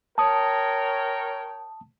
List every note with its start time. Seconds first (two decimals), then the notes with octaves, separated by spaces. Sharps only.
0.18 A#4 C#5 G5 A5 D#6